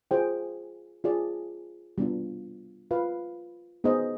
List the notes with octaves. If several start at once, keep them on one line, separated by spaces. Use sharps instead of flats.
F4 G#4 C5 G5
F4 G#4 D5
G3 B3 D4 F4
F4 B4 F5
B3 D#4 G#4 C5 D#5